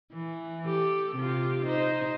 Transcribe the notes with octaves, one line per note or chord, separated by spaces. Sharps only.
E3
G4 A4
C3 F4 G4
D#4 C5